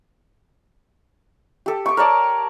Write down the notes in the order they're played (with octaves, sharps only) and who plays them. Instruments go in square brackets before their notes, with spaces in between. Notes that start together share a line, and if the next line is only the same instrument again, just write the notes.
[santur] G4 A4
C#6 D6
A#4 C#5 D5 A5